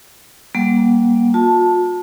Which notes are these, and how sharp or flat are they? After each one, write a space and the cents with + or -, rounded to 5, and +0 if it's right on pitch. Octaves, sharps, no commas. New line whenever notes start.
G3 +0 A#3 +25 F#5 +0
F4 +45 A5 +0